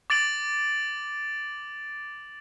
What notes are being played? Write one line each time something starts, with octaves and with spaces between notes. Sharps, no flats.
D6 A6 D7 F#7